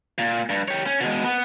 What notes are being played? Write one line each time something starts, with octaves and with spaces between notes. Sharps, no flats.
A#2
G2
G4 C#5
C#4
B2 G#3
B3